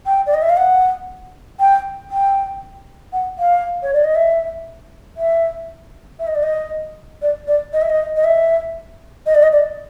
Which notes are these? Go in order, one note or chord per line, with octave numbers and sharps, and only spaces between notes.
G5
D5
D#5
E5
F5
F#5
G5
G5
F#5
F5
C#5
D5
D#5
E5
E5
E5
D#5
D5
D#5
D5
D5
D#5
E5
D#5
D#5
E5
D#5
D5
D#5
D5